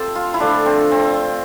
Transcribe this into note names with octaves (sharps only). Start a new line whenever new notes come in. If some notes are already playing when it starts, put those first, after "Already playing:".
Already playing: C3 F3 A3 G4 A4 C5
F4
E4
D3 F3 A3 D4
C4
C4